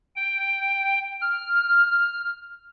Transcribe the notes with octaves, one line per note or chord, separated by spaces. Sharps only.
G5
F6